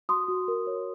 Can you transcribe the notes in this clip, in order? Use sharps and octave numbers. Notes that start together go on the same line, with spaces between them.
F#4 C6 D#6
F#4
A#4
C#5